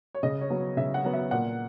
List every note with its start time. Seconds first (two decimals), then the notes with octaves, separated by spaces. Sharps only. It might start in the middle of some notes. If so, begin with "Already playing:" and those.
0.15 C#5
0.23 C#3 D#5
0.41 C#5
0.50 F#3 B3
0.77 C#3 E5
0.94 F#5
1.05 F#3 B3
1.14 E5
1.31 A#2 F#5